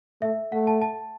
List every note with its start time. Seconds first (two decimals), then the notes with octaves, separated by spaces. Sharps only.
0.22 A3 E5
0.52 A3 F#5
0.67 A5
0.82 A5